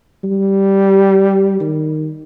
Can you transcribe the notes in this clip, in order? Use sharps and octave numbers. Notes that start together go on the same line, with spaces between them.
G3
D#3